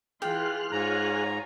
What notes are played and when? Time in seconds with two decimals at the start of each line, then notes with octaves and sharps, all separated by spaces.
0.22 E3 F4 G#4 G5 C6 F6 F#6
0.72 G#2 F4 C#5 G#5 A#5